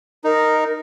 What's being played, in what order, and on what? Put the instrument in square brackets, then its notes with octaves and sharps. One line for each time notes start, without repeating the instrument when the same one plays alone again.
[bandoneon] D#4 [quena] A#4